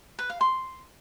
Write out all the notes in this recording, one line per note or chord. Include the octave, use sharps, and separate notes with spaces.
B4
F5
C6